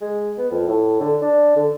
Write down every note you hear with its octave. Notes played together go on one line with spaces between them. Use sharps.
G#3
B3
F2
A2
D3
D4
D3